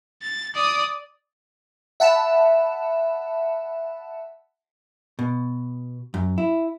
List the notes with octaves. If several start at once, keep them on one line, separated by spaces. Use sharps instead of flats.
A6
D5 D#6
E5 F#5 A5 B5 E7
B2
F#2
E4